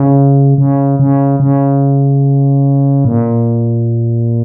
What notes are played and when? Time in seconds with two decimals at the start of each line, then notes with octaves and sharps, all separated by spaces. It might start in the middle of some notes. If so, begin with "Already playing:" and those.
Already playing: C#3
0.58 C#3
0.99 C#3
1.40 C#3
3.05 A#2